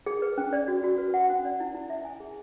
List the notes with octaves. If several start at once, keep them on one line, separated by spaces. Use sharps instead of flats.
G#4
B4
C#4
D5
F#4
F#4
B4
F#5
C#4
D5
E4
E4
E5
G#5
G#4